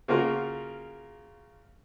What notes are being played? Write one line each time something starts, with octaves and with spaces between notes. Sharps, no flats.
C#3 A#3 F4 F#4 A#4